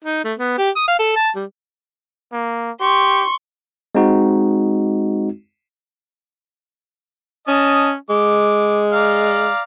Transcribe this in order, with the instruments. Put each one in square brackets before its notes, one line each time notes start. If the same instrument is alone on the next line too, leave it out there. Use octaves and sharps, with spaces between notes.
[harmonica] D#4
A3
B3
G4
D#6
F5
A4
A5
G3
[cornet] A#3
[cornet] G4 [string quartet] C6 C#6
[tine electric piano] G#3 C4 D#4 F#4
[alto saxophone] C#4 [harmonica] D#5 A5 D#6
[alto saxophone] G#3 [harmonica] D6
[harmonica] D5 F5 A#5